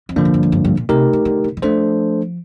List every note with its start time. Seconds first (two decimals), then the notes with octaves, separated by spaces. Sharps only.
0.09 F2
0.16 G2 D3 F3 A#3 D4
0.25 A2
0.34 G2
0.43 F2
0.52 G2
0.65 G2
0.77 A#2
0.89 C3 A3 D#4 G4 A#4
1.13 D3
1.25 D3
1.44 D3
1.57 D#3
1.62 F3 A3 D4 A4 C5